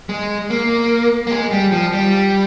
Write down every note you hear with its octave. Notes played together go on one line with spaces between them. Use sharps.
G#3
A#3
A#3
G#3
G3
F3
G3